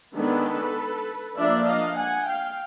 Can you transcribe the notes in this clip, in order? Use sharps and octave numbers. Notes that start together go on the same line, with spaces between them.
D#3 G#3 B3 D4 A4 B4
F3 A#3 D4 D5 E5
D#5 F5
F#5 G#5
F5 G5